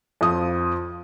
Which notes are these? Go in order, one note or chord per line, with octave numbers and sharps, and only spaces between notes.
F2 F3 D#6